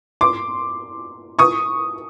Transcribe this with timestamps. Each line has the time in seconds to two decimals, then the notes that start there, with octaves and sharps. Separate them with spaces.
0.21 C6 D6
1.39 C#6 D#6